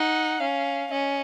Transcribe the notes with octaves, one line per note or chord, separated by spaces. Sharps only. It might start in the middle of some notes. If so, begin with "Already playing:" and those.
Already playing: D#4 F#5
C#4 F5
C#4 D#5